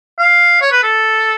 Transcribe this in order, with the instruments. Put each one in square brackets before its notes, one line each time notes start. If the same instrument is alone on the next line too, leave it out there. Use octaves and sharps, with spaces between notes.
[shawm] F5
C#5
B4
A4